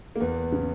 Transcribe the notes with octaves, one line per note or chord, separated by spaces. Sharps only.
A#3
E2 B3
C#3